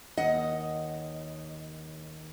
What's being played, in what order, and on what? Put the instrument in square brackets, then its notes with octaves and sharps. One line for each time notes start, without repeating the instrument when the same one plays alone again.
[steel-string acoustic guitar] D#2 D#5 F#5